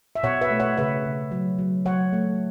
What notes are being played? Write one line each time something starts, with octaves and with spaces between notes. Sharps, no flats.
E5
B2 C#5 F#5
B4 E5
A3
C#5 F#5
C#3 B4 E5
C#3
F#3
F#3
F#3 C#5 F#5
A3